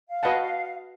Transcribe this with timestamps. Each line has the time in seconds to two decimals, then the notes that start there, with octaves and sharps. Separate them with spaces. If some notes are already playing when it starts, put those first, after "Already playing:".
0.09 F5
0.23 F#4 B4 D#5 F#5 A5